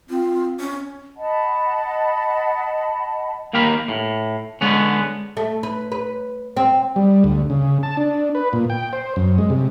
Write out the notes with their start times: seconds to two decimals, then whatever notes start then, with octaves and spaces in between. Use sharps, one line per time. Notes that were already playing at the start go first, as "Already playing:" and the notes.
0.10 C4 F4
0.60 C#4
1.17 D#5 F#5 A5 B5
3.53 D#2 A#3 G4 A#4 B5
3.88 A2
4.61 D3 G#3 B3 C#4
5.37 A3
5.63 B4
5.92 B4
6.57 C4
6.96 G3
7.24 D2
7.50 C#3
7.83 A5
7.97 D4
8.35 B4
8.53 A#2
8.70 G5
8.93 C5
9.16 F#2
9.38 G#3
9.50 C3